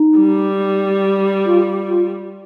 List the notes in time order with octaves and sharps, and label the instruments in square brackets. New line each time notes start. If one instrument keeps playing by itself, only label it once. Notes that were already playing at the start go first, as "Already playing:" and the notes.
Already playing: [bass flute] D#4
[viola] G3
[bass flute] F4
F4